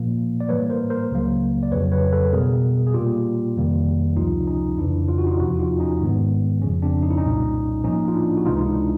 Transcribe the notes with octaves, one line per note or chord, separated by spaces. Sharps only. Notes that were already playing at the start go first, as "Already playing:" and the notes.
Already playing: A#2 F3 A#3
D5
A2 E3 G3 A#3 B4 C#5
A#4 C5
A#4 C5
C#2 C#3 F#3 A#3
D5
F2 C#3 F#3 B4 C#5
B4 C#5
A4 B4
B2 G3 B3 G#4 A#4
G#4
A#2 G3 A#3 F4 G4
F2 C3 D#3 G3 A#3
C#2 C3 F3 D#4 F4
C#4 D#4
F2 C#3 E3 D4 E4
F4
F#4
D#4 F4
E2 C3 F3 E4 F#4
F#4
D#4 F4
C#4 D#4
G#2 D#3 G#3 B3
F2 C#3 F3 C#4
C4 D4
D#4
E4
C#4 D#4
C2 A#2 G3
A2 F3 A#3 C#4 D#4
F4
D4 E4
F#4
C#2 C3 E3 G#3 D#4 F4
D#4
D4 E4